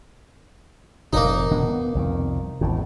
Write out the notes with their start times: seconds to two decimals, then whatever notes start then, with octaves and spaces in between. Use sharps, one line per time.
1.13 F1 A#2 A#3 D#4
1.51 D#1 B2 D4
1.69 B3
1.95 C2 F2 D#3
2.61 G#1 E2 A2